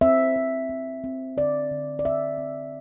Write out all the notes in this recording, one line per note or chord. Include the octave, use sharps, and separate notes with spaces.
C4 E5
C4
C4
C4
D3 D5
D3
D5
C4 E5
C4